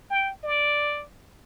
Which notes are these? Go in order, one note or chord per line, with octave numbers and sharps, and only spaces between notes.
G5
D5